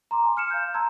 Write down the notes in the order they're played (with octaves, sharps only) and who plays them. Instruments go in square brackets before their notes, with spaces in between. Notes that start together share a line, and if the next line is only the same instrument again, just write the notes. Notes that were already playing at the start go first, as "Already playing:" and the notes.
[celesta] A#5 C6 D6
G#5
F6 C#7 E7
F5 G6
A5 A#5 C6 E6 G#6